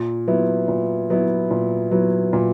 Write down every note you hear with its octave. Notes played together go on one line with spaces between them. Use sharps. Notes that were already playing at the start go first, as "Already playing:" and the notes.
Already playing: A#2
F#3 B3 E4
A#2
F#3 B3 E4
A#2
F#3 B3 E4
A#2